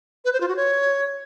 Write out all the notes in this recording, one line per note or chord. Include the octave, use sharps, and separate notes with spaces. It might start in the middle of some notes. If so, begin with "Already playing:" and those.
B4
C5
F4
F#4
C#5